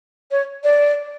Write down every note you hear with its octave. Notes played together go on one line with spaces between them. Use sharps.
C#5
D5